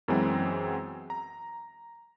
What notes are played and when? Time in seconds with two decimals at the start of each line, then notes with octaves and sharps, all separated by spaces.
0.08 F#2 E3 F#3 G#3 B3 C4
1.10 A#5